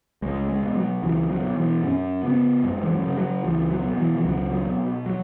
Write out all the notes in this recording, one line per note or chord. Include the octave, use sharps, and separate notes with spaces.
C#2 G#3
G#3
B2
F#3
C#2 E3
F#3
B2
E3
F#2 C#4
C#3 B3
F#2 G#3
E3
F#3
C#3
F#3
C#2 E3
F#3
B2
E3
E3
C#2 F#3
F#3
B2
F#3